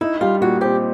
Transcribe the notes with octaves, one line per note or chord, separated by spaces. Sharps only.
D#4 E4
G3 F4
A#2 F#4
C4 G4